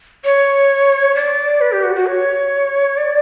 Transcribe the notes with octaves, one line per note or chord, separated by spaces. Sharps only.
C#5
D5
B4
G4
F#4
F#4
C#5
D5